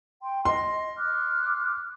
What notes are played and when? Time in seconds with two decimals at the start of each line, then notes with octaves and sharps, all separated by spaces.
0.22 G5 C6
0.45 D#5 C6
0.98 D6 F6 F#6